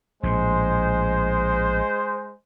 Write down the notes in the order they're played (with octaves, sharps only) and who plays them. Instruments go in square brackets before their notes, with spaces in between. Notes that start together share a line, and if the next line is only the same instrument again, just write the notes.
[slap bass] A#1 A2 [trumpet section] G#3 C5